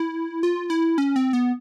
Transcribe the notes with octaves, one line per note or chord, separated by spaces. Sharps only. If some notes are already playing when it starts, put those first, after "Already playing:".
Already playing: E4
F4
E4
C#4
C4
B3